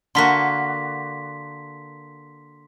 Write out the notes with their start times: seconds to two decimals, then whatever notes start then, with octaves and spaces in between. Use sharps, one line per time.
0.15 D3 A#3 F#4 C6 B6